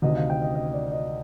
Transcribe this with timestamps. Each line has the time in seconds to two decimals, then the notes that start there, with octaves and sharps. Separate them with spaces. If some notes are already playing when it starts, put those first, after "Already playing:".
0.02 D2 C3 D#3 D#5
0.16 F5
0.30 G5
0.42 D#5
0.55 D#5
0.74 D5
0.92 D#5